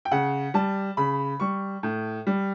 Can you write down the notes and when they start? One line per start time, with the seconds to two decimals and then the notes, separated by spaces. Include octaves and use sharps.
0.05 G5
0.11 C#3 F#5
0.54 G3 A5
0.97 C#3 B5
1.40 G3 C#6
1.83 A2
2.27 G3